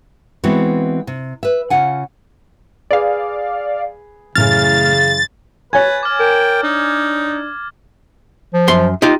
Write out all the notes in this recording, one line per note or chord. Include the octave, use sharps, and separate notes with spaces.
E3 G#3 B3 C4 E4 F#4
C3
B4 E5
C#3 F4 F#5 G#5
G#4 B4 D5 F5
F#2 A2 C#3 E3 F6 A6
B4 C#5 G#5 G#6 A6
D6 F6
A#4 G5
D4 D#4
F3
F#2 C6
D#4 F4 G4